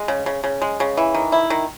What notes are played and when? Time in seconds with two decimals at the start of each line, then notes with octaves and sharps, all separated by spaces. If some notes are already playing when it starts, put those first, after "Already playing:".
Already playing: G#3
0.08 C#3
0.26 C#3
0.44 C#3
0.62 G#3
0.80 C#3
0.97 E3
1.14 D#3
1.32 E4
1.50 D#3